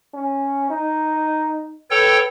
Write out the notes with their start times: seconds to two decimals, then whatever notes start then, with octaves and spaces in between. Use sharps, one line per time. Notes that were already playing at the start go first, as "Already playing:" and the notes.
0.14 C#4
0.70 D#4
1.91 A4 B4 C#5 G5